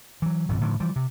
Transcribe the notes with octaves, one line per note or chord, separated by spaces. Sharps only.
E3 F#3
G#1 F2 A#2
A2 D3 D#3 F3
E3 F3 G3
C3